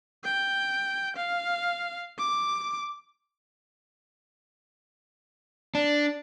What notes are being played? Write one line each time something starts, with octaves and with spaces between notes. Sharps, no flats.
G5
F5
D6
D4